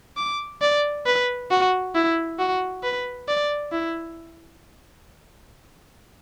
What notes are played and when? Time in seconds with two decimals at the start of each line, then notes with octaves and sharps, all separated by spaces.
0.17 D6
0.61 D5
1.06 B4
1.51 F#4
1.95 E4
2.39 F#4
2.83 B4
3.28 D5
3.72 E4